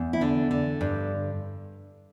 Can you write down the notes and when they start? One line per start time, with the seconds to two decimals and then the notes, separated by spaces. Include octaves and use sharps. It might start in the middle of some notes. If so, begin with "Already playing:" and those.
Already playing: E2
0.13 E4
0.21 D3 D4
0.51 D3
0.81 G2